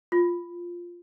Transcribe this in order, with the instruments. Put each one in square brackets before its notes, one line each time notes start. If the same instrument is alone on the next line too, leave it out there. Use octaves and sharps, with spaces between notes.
[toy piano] F4